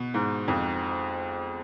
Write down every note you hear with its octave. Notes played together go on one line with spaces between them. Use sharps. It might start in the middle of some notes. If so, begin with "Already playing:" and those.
Already playing: B2
G#2
F2